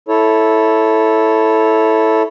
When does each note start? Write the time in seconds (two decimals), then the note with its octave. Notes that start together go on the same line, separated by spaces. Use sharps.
0.08 E4 A4 C#5